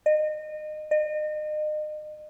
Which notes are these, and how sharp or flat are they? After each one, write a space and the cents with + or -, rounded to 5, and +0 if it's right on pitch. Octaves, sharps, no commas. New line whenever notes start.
D#5 -30
D#5 -35